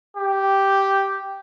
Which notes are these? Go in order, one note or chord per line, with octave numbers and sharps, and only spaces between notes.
G4